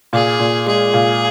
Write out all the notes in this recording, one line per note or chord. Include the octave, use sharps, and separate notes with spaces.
A#2 G#4
A#2
G#3 G#4
A#2